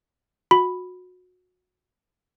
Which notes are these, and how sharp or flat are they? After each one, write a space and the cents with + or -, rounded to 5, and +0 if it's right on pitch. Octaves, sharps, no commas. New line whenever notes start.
F#4 -25 B5 +0